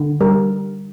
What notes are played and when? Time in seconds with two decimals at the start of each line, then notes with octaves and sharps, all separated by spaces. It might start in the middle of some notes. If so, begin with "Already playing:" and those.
Already playing: D3
0.21 G3 A#4